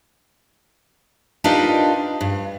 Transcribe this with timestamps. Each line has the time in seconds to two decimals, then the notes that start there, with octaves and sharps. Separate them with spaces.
1.44 D4 D#4 F4 G4 A#4 B4
2.21 G2